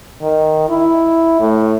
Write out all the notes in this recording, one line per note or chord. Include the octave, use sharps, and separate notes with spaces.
D#3
E4
A2